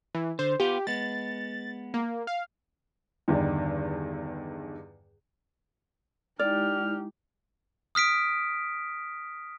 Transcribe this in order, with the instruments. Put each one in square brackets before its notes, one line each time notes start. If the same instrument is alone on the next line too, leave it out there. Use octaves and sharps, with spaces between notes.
[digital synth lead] E3
[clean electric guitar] D3 [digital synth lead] C5
[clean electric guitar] B3 F4 [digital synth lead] G4
[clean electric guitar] G#3 B3 [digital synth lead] A6
[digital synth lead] A#3
F5
[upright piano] E2 G2 D3 D#3
[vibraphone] G#3 E4 [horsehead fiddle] D#4 G4 [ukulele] D5 [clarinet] F6
[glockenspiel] D#6 F6 B6 D7